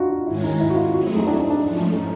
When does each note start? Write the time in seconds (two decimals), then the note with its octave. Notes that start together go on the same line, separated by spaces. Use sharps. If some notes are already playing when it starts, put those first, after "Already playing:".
Already playing: D4 D#4 F4 F#4
0.10 F4
0.27 G#2 D#3 G#3 C#4 E4
0.44 D#4
0.60 E4
0.70 F#4
0.76 F4
0.94 F#3 A3 C4 E4 F#4 G#4
1.16 D#4
1.27 D4
1.39 D#4
1.50 D4
1.61 G#2 F3 A3 C#4
1.94 D#4